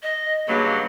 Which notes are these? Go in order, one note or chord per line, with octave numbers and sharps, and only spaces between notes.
D#5
G2 C#3 F#3 A#3